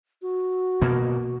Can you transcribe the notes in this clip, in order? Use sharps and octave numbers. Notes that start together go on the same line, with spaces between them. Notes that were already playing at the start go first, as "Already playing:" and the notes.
F#4
B2 A#3